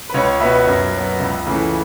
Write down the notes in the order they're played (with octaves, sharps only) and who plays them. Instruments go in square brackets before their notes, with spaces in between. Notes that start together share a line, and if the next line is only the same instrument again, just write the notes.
[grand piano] B4
C#2 C#5
B2 B3 B4 E5
F#2
F#3 B3
C#2
C#3 E3 A3